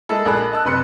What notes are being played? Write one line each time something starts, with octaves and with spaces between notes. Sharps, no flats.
G#3 A#3 E4 A4
A#1 A#3 G#4 A5 B5 F#6
D#5 A5 E6 F#6
F#1 C3 B4 C6 F#6 C#7